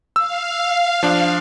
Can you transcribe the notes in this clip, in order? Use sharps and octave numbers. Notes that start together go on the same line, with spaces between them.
F5 E6
F3 D4